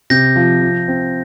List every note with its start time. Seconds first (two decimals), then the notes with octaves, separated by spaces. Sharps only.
0.10 C3 G6 A#6
0.36 F3
0.62 F3
0.88 C4